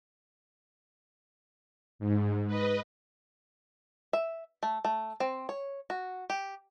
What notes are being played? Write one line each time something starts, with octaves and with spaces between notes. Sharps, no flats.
G#2
B4 D#5
E5
A3
A3
C4
C#5
F#4
G4